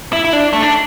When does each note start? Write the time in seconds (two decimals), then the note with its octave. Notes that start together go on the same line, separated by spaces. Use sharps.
0.13 E4
0.24 E4
0.33 D4
0.53 A3
0.63 D4